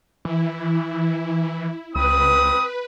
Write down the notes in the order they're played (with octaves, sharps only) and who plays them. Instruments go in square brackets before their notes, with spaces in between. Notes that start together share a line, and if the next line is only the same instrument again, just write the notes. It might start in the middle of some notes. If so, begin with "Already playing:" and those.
[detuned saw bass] E3 [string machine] E4
[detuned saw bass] C#2 [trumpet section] C4 B5 D#6 [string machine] B4